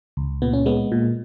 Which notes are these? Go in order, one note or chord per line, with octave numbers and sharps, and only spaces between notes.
C#2
A#2 B3
C#4
G#3 B3
A#2